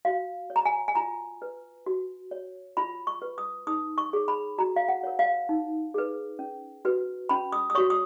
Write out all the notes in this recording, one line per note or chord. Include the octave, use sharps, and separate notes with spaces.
F#4 F5
C#5
A#5
G#5
G#5
F4 A#5
B4
F#4
C#5
F4 B5
C#6
B4
D#6
D#4 D#6
C#6
G#4 C#5
B5
F#4 A#5
F5
F#5
A#4 C#5
F5
D#4
G#4 B4
C#4
F#4 B4
C#4 B5
D#6
D#6
F#4 C#5 C#6
D#6